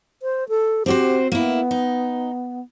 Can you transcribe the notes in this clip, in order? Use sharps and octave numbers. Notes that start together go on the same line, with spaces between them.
C5
A4
C4 F#4 G4 C5
A#3 B3 E4
D#4